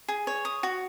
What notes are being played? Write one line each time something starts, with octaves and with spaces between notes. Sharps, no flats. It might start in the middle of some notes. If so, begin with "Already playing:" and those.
G#4
C#5
D#6
F#4